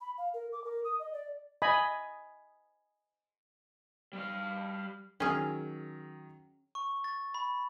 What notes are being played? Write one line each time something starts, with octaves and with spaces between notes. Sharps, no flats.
B5
F5
A#4
D6
A#4
D#6
D#5
D5
D#5 G#5 B5
G3 F5
D#3 F#3 C#4 G#4 F6
C#6
A6
B5